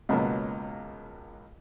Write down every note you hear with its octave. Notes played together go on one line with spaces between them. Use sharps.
C#2 B2 F#3 A#3